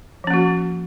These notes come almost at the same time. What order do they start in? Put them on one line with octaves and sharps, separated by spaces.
F3 C#4 A#3 F#4